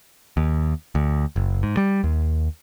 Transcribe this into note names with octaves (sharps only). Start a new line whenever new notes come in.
D#2
D2
F#1
G#2
G3
D#2